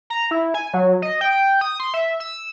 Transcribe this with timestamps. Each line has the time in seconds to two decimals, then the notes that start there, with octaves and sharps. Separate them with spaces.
0.10 A#5
0.31 E4
0.54 G#5
0.74 F#3
1.02 D#5
1.21 G5
1.61 D#6
1.80 C6
1.94 E5
2.20 E6